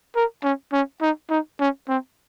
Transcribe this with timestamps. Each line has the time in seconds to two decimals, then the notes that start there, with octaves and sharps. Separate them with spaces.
0.16 A#4
0.44 C#4
0.73 C#4
1.01 D#4
1.30 D#4
1.60 C#4
1.88 C4